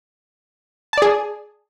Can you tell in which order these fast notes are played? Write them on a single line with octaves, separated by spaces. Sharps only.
A5 D5 G#4